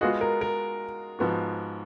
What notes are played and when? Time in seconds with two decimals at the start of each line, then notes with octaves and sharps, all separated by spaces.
0.01 G#3 B3 F4 F#4 G#4 D#5
0.21 A#4
0.41 A#4
1.19 G#2 F3 B3 F#4